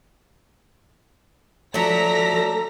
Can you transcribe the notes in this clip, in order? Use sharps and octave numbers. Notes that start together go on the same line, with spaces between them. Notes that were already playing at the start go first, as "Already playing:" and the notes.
F3 F#3 A3 D4 A4 A#5 A#6 B6